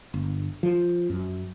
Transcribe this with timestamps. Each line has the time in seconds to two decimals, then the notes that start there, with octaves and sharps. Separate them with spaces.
0.14 G1
0.63 F3
1.10 F#2